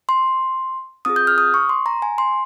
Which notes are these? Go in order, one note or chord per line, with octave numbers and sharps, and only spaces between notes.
C6
C4 F4 G#4 D#6
G6
F6
D#6
C#6
C6
A#5
G#5
C6